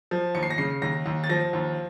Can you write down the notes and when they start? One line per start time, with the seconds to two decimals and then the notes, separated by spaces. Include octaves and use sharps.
0.11 F3
0.35 D#2 C#7
0.43 C7
0.50 A#6
0.58 C#3 C7
0.82 D#2 A#6
1.06 D#2
1.24 A6
1.29 F3 A#6
1.53 D#2